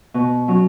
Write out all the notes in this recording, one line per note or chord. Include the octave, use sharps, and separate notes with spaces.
B2
F#3 C#4 F#4